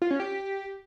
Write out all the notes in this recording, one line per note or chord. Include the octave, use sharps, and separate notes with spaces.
F4
C#4
G4